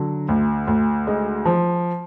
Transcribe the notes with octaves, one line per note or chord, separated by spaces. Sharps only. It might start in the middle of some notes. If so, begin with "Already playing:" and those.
Already playing: D3 F#3
D2
D2
G#3
F3